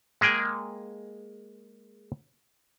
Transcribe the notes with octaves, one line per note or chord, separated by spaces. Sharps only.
G#3 A#3 G#4 G5 G#5